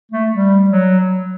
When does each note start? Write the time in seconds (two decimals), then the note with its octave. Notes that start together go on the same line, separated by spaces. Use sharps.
0.12 A3
0.31 G3
0.70 F#3